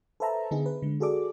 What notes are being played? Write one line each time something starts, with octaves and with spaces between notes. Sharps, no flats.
A4 B4 C5 E5 A5 A#5
D3 B3 D#4 G#4
B4
D3 G#3
F#4 G#4 A4 D5 D6